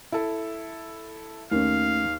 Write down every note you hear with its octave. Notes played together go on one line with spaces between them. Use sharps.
E4 A4
D#2 A3 C#4 F5